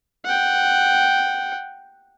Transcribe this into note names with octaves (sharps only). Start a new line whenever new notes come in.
F#5 G5